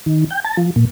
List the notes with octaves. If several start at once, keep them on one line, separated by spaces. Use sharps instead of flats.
D#3
G5
A5
F3
A#2